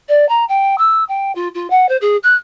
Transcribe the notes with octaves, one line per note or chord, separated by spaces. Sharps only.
D5
A#5
G5
E6
G5
F4
F4
F#5
C5
G#4
F#6